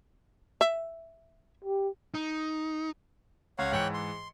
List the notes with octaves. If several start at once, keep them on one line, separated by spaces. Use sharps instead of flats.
E5
G4
D#4
C#2 C#5 F5 F#5
G#2 E3 C#5 G5 F#6 C#7
C6